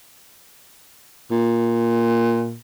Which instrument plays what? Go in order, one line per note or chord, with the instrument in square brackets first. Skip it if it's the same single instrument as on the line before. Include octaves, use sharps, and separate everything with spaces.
[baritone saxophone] A#2